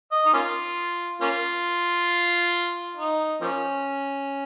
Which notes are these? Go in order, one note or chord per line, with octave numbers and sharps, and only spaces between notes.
D#5
D#4
A#3 C#4 F4
A#3 C#4 F4
D#4
F3 A#3 C#4